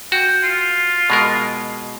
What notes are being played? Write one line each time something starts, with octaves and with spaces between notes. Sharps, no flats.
F#4 G5
F4
B2 G#3 A#4